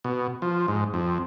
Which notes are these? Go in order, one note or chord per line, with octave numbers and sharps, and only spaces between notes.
B2
F3
G#2
F2